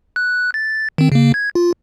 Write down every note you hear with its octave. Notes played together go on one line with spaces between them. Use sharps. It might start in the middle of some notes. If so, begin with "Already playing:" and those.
F#6
A6
D#3 C4
C#3 A#3
G#6
F4